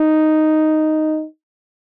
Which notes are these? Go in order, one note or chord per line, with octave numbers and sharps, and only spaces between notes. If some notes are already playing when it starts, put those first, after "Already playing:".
Already playing: D#4